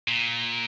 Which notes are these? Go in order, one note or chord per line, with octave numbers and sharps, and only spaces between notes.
A#2